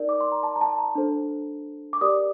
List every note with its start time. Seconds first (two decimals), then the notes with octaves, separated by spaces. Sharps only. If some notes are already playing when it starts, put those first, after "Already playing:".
Already playing: D#4 A#4 D5
0.09 D6
0.21 C6
0.32 A#5
0.43 A5
0.56 A#5
0.61 A5
0.78 A#5
0.95 D4 A4 C5
1.93 D6
2.01 G4 A#4 D5 D#6